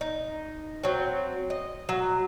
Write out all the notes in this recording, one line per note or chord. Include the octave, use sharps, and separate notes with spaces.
D#4
F#3 C4
D#5
F#3